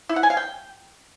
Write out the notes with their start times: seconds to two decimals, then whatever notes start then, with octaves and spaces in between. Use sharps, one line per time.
0.09 E4
0.16 F#5
0.23 G#5
0.30 F5
0.37 G5